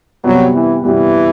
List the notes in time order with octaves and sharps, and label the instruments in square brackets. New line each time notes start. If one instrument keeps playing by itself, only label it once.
[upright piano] C3 G3 B3 [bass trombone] F#3
[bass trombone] E3
[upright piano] C3 G3 B3 [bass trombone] E3